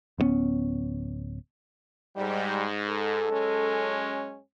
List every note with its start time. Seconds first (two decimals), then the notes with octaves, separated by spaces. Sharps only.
0.18 D1 G2 B3 C#4
2.16 G#2 G3
2.89 A4
3.30 F#2 G#3 C#4